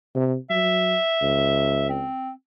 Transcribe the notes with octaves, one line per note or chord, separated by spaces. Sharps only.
C3
F#3 E5
C#2
C4